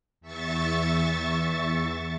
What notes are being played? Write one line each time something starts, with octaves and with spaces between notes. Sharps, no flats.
E2 E5 C#6 A6